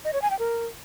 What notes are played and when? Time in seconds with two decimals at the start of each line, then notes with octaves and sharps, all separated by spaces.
0.05 D#5
0.13 C#5
0.22 G#5
0.31 G5
0.39 A#4